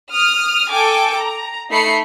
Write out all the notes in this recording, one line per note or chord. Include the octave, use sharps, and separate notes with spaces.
D#6 F6
A4 G5 G#5 D6
A#5
A3 D#4 B5 C7 C#7